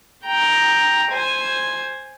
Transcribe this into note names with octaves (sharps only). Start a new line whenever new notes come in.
G5 A#5
C5 G#5